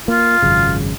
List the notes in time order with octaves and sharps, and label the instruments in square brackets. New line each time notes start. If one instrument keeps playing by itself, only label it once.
[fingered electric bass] A#3 [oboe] F4
[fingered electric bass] G#1 F#2 C#3